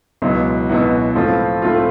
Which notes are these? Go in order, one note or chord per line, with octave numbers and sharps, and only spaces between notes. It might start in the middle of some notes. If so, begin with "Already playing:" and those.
C#2 B2 F#3 B3 E4
C#2 B2 F#3 B3 E4
A2 F3 A3 C4 F4
A2 F3 A3 C4 F4